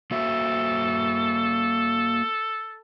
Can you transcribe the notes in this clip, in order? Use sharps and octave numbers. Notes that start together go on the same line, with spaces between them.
A#3 F#4 A4 E5